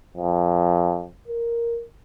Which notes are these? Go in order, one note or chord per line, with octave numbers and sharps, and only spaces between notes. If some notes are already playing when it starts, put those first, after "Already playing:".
F2
A#4